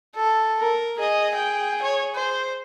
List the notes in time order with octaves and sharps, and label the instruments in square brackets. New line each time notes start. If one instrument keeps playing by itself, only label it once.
[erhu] A4
[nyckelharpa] A#4
[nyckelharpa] G#4 [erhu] D#5
[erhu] G5
C#5
C5